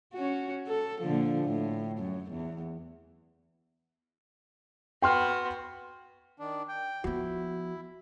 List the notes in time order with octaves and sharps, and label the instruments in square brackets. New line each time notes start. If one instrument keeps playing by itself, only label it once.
[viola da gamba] C#4 F#4
A4
A#2 D3 F3
A2
F#2
E2
[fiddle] B3 F#4 [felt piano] G5 C6 F6
[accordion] D#3 D4
G5
[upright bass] F3 B3 [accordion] E4 [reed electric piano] F#4